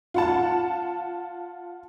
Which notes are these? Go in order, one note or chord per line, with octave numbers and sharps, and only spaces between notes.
F4 F#5 A5